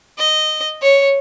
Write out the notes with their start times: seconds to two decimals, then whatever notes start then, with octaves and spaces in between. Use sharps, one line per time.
0.18 D#5
0.82 C#5